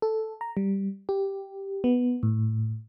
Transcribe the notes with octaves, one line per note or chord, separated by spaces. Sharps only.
A4
A#5
G3
G4
B3
A2